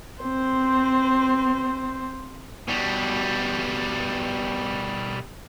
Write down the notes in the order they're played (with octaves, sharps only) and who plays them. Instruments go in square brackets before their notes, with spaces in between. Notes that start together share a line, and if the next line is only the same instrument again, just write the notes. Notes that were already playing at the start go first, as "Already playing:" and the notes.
[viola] C4 C5
[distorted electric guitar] B2 G3